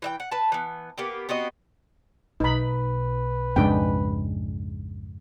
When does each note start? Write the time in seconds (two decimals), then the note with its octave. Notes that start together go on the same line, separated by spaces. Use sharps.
0.02 E3 E5 G5
0.20 F#5
0.32 B4 A5
0.52 E3 B3
0.98 A#3 B3 G4
1.29 B3 C4 F#4 D#5
2.40 B1 B2 D#4 B4 B5
3.56 F2 G#2 C#3 G#3 D4 G5